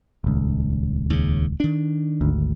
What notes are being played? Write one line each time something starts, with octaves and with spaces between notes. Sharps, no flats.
D#1 C#2
D#2 C#3
D#3 D4
G#1 D2